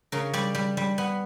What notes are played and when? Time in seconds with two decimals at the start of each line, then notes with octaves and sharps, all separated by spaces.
0.12 C#3 A#4
0.34 G3 D5
0.55 G3
0.77 G3
0.98 B3